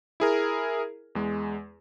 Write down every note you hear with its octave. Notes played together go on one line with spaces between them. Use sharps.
E4 G#4 A#4
E2 G#3